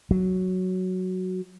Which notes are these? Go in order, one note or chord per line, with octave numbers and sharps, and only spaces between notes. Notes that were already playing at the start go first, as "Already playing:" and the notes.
F#3